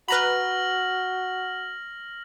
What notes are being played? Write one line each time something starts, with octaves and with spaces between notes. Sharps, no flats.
F#4 B4 A#5 B5 F6 A#6 F#7